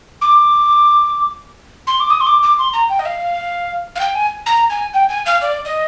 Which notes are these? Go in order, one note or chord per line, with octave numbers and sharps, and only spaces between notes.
D6
C6
D6
D#6
C6
D6
D6
C6
A#5
G5
D#5
F5
F5
G5
G#5
A#5
G#5
G5
G#5
F5
D5
D#5